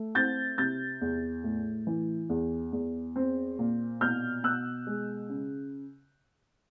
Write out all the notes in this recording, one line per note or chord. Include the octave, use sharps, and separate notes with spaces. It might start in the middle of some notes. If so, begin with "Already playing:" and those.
Already playing: A3
C4 G6 A6
C3 G6 A6
E2
A2
E3
E2
E2
C4
A#2
B2 F6 G6
B2 E6 F#6
G#3
C#3